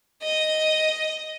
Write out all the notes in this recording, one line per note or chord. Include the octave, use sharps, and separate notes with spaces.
D#5